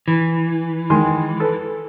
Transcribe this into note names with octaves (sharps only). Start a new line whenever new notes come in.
E3
D#3 G#3 C6
A4 B4